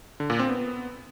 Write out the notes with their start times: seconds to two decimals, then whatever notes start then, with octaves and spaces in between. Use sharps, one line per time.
0.20 D3
0.30 A#2
0.39 C4
0.49 B3